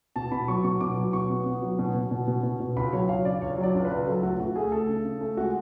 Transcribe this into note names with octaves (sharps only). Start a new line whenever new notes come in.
B2 A5
B2 B5
F#3 C#6
B2 C#6
B2 D6
F#3
B2 C#6
B3
B3
F#3
B2
B2
B2
B2
B2
B2
C#2 B5
F#3 C#5
F#3 F5
C#3 D5
C#2 C#5
F#3
D5
C#2
B4
C#2
F#3 A4
A3 F#4
C#2 F#4
A3 G#4
A3 A4
C#3
C#3
A3
G#3 F#4